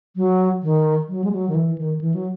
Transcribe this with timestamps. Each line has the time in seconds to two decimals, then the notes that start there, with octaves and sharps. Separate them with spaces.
0.16 F#3
0.63 D#3
1.09 F#3
1.24 G#3
1.32 F#3
1.49 D#3
1.55 E3
1.78 D#3
2.01 E3
2.14 F#3